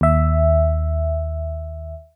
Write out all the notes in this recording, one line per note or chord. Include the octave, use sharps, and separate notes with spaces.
D#2 E5